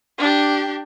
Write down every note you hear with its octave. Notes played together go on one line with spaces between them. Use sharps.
D4 G4